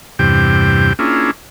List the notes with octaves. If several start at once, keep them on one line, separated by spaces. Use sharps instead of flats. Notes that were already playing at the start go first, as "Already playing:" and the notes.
E2 G2 C3 G4 G5
A#3 C#4 D4 E4 F4 G#4